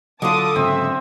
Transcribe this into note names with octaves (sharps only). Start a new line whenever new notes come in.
D3 F#3 F4 A5 D6 D#6
G#2 C#3 F#3 C4 E5